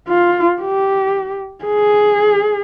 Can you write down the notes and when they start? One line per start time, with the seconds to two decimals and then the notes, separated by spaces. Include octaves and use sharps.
0.08 F4
0.61 G4
1.65 G#4